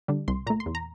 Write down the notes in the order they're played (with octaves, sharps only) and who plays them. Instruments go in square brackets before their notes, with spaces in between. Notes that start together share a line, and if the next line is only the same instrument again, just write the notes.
[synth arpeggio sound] D3 G3 D4
C2 C6
A#2 A3 A#5
C6
E2
A#5